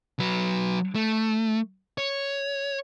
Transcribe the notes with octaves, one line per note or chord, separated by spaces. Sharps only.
F#3 B4
A3
C#5